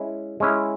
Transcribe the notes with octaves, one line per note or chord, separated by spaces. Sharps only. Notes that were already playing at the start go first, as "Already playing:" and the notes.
Already playing: G#3 C#4 E4
G#3 C#4 E4